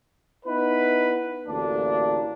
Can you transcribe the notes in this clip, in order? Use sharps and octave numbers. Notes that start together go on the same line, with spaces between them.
B3 D#4 E4 B4
A1 D2 A#3 D4